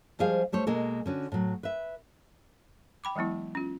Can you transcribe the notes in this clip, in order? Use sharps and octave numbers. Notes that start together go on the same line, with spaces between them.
F3 G3 G#3 G#4 C5 F5
G3 A3 C5 C#5
B2 G#3 A#3 A4
D3 C#4 F#4
A2 F#3
B4 E5
G5 B5 D6
E3 F#3 G#3 B3 E4
C#4 F4